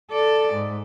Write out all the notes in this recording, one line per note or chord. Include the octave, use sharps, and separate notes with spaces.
A4 D5
G#2